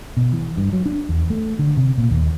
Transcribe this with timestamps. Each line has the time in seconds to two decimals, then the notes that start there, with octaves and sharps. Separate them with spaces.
0.17 B2
0.33 E3
0.57 G2
0.73 F#3
0.86 D4
1.09 E2
1.30 A3
1.59 D3
1.77 C3
1.98 A#2
2.11 D#2